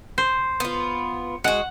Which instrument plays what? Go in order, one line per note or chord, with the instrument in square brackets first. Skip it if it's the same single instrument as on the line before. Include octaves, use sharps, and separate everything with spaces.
[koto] C5
[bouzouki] B3 F4
[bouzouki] G#3 F#4 [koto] F#5